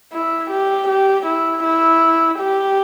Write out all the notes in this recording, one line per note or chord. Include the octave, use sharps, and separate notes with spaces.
E4
G4
G4
E4
E4
G4